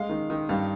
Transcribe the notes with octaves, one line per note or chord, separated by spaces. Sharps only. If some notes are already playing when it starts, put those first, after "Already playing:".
Already playing: G#3 F5
D#3
D#3
G2 F5